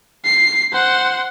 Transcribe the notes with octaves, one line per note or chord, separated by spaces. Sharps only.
C7
C5 F#5